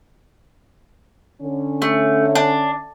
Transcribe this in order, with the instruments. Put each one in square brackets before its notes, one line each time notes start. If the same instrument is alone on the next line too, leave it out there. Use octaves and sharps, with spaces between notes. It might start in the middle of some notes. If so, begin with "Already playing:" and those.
[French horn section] D3 C#4
[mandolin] A3
D4